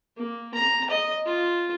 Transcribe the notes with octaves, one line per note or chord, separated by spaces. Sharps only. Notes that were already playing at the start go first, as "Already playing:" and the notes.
A#3
A#5
D#5
F4